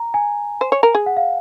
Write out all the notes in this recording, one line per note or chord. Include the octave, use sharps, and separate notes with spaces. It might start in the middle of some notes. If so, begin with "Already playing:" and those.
Already playing: A#5
G#5
C5
C#5
A#4
G#4
F#5
F5